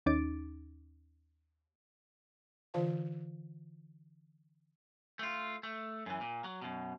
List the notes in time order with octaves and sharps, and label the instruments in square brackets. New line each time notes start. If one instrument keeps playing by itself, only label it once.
[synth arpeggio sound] D#2 C#4 D#4 D6 A6 D7
[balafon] D3 E3 F4 C5 F5 A5
[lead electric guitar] A3 F4
A3
F#2 E3
A#2
F#3
F#2 B2